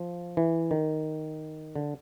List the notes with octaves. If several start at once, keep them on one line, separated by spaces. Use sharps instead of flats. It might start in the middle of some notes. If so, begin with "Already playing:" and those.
Already playing: F3
E3
D#3
D3